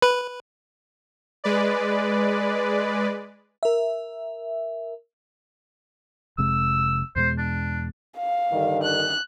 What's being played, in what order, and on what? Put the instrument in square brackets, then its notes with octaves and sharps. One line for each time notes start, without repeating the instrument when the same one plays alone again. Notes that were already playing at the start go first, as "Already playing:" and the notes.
[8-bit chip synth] B4
[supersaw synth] G#3 B4 D5
[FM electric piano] A#4 E5
[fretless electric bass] F1 C3 G#3 [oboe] E6
[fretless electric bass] E2 B2 G#3 [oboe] C5
[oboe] D4
[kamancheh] F5
[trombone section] G2 D3 D#3
[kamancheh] F#6